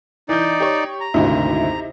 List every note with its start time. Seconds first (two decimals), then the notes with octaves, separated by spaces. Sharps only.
0.29 E3 D#4 D5 G6
0.60 G4 C#5
1.01 A#5
1.14 G#1 D2 C3 D#4 E4